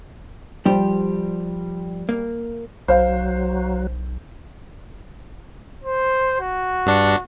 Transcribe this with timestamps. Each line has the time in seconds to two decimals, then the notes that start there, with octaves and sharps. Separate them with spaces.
0.65 F3 G3 G4 C5
2.09 A#3
2.88 B1 F#3 C5 F5
5.84 C5
6.40 F#4
6.86 G2 D4 C#7